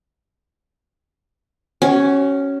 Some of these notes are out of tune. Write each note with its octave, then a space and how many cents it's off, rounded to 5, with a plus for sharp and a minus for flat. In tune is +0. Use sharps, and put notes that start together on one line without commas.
C#4 +0 F#4 +40